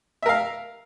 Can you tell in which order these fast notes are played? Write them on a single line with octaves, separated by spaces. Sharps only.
E5 A#4 F5